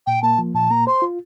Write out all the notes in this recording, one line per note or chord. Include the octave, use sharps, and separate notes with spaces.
A#2 G5
A#3 A5
F3
A#2 A5
A#3 A#5
C5 C6
F4